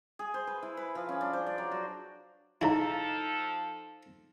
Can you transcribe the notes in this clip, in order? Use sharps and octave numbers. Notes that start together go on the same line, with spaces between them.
G#4
C5
B4
E4
B4
F3
C#4
D4
C5
D5
F#3
F#4
C#3 F3 D#4 E4 A4 D#5 A#5